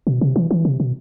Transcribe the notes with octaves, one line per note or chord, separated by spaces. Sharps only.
B2
C3
E3
E3
C3
B2